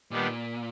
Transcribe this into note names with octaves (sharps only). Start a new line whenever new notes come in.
A#2 D#3 G3 B3 D4